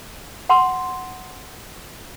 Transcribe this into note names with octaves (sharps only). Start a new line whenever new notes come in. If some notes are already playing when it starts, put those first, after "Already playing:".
F#5 C6